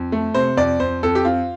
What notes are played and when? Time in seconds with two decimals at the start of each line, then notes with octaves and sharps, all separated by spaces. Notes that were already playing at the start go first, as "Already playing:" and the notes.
Already playing: F2
0.12 A3
0.34 C3 C5
0.57 F2 D5
0.80 F2 C5
1.03 F2 A4
1.15 G4
1.24 C4 F4